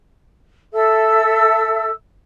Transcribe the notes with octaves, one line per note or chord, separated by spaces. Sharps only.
A4 E5 E6